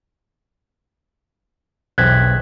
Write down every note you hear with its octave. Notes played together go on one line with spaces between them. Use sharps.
B1 E2 C4 F#6 G#6 B6